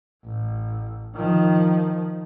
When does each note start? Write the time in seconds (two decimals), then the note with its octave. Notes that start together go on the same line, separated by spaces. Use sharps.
0.24 A1
1.16 D#3 F3